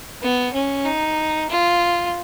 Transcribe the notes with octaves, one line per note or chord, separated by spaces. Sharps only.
B3
C#4
D#4
F4